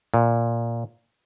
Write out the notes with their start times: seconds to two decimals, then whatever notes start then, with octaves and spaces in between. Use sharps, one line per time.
0.14 A#2